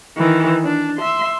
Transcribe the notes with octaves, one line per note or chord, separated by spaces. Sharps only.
D#3 E3
D4
E5 C6